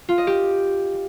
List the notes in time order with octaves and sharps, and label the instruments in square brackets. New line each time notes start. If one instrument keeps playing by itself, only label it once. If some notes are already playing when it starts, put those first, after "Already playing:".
[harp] F4
D#5
G4